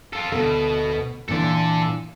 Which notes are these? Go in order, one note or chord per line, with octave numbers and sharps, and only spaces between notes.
F4 A4
D2 B2 B3 A4
A#2 E3 D4 A4 D5